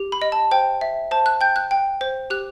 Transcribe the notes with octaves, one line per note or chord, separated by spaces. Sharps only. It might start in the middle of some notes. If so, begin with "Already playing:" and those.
Already playing: G4
B5
D#5
A5
C5 G5
E5
C5 A5
F#6
G5 G6
F#6
G5
C5
G4 F#6